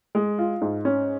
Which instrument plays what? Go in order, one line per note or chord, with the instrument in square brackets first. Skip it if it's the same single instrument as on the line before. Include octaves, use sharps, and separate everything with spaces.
[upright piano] G#3
F4
G#2
C#4